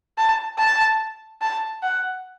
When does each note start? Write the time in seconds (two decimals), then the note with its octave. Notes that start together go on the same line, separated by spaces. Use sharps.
0.18 A5
0.58 A5
1.41 A5
1.83 F#5